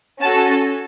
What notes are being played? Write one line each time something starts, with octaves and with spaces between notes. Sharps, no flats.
C#4 F#4 A4 A5